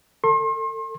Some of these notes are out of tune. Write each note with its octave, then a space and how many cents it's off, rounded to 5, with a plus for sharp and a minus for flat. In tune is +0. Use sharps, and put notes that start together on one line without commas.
A4 +35 C6 +40